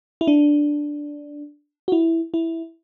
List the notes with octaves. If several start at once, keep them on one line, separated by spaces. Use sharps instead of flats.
E4
D4
F#4
E4
E4